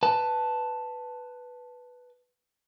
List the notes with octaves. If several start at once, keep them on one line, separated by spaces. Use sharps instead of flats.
B4 A5